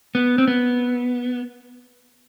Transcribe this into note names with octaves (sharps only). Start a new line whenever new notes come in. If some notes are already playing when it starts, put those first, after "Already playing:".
B3
C4
B3